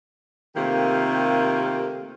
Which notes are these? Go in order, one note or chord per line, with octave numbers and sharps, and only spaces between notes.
C3 D#3 A3 A#3 F4 G4